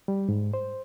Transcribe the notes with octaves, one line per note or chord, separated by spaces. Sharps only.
G3
G#2
C5